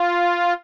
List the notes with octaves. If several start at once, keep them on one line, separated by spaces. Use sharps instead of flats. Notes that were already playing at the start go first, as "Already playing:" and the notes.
Already playing: F4